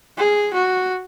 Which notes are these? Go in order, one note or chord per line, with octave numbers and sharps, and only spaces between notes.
G#4
F#4